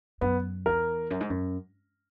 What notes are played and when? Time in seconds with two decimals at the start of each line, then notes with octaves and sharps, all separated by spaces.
0.21 F#2 B3
0.66 E2 A#4
1.10 F#2
1.20 G#2
1.30 F#2